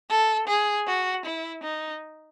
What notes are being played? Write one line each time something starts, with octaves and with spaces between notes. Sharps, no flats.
A4
G#4
F#4
E4
D#4